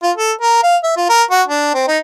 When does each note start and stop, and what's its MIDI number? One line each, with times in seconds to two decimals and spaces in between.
0.03 0.11 65
0.17 0.32 69
0.41 0.60 70
0.64 0.77 77
0.84 0.94 76
0.97 1.07 65
1.10 1.23 70
1.31 1.42 66
1.48 1.70 62
1.74 1.84 60
1.88 1.98 63